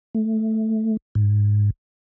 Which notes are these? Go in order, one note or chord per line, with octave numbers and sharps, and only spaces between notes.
A3
G#2